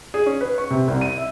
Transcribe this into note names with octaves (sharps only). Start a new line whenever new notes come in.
G#4
C#4
B4
C#6
C3
C2
D#7
E5